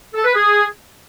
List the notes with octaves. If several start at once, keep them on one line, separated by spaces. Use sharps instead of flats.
A4
B4
G#4